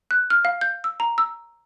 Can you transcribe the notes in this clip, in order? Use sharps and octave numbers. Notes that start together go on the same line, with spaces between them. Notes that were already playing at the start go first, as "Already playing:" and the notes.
F#6
F6
F5
G6
E6
A#5
E6